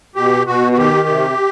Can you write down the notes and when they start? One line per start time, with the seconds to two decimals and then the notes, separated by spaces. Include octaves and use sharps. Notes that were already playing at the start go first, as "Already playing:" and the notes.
0.16 B2 G4
0.47 B2 F#4
0.73 F#4
0.77 D#3 G4
1.08 C3